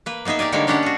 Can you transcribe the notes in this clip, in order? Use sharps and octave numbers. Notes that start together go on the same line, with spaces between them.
A#3 B4
A#3 B3 D#4 G#4 E5
G4 A#4 D5 G#5
D3 G3 G#3 A#3 D#4 C#5
G#3 C#4 D4 G4 C#5 F#5
F#4 G#4